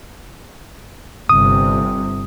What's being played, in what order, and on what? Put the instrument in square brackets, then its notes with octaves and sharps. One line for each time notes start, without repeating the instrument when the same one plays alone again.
[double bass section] G1 C3 [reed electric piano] D#6